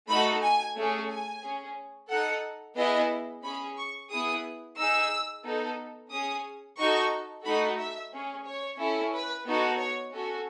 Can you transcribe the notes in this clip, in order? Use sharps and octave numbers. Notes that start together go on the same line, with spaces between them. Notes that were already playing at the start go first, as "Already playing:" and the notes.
A3 D#4 F#4 A4 B5
G#5
A3 C#4 G#4
G#5
C#4 G#4
D#4 A4 F#5
B3 E4 G#4 D#5
C#4 G#4 B5
C#6
B3 E4 G#4 D#6
D#4 G#4 E6
B3 D#4 A4
C#4 G#4 D#6
D#4 F#4 A4 C#6
A3 D#4 F#4 A4 B5
E5
C#4 G#4
C#5
C#4 E4 A4
B4
B3 D#4 F#4 A4
C#5
C#4 F#4 A4